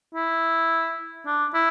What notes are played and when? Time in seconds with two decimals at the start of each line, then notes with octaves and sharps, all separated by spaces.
0.15 E4
1.26 D4
1.54 E4